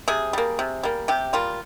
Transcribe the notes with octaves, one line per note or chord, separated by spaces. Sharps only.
C3 G#4
G3 A#3
C3
G3 A#3
C3 G4
G3 A#3 F4